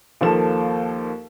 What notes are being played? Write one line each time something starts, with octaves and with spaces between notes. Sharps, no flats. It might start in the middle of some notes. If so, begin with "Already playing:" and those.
D#2 F3 A#3 A4 E7